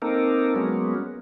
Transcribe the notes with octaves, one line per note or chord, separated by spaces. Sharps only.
A#3 C4 D#4 A4 A#4
F#3 G#3 A#3 B3 C#4